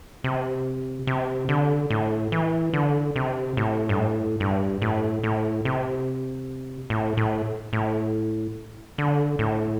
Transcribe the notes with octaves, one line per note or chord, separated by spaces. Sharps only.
C3
C3
D3
A2
E3
D3
C3
A2
G2
A2
G2
A2
A2
C3
A2
A2
A2
D3
A2